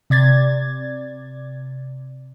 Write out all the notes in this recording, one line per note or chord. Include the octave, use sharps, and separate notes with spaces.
C3 D5 G#6 A6